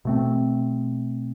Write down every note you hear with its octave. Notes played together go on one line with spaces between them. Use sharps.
B2 A3 C4